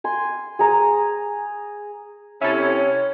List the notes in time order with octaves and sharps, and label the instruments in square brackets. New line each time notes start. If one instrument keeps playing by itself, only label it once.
[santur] G#5 C6
G#4 A#5
[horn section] C3 C#4 [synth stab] E4 A4 [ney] C#5